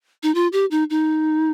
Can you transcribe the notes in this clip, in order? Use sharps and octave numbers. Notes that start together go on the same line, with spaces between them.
D#4
F4
G4
D#4
D#4